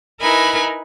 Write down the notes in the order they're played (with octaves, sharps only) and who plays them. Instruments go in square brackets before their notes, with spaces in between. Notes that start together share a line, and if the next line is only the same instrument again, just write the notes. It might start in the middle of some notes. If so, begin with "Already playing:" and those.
[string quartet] D#4 E4 A#4 B4 G#5 B5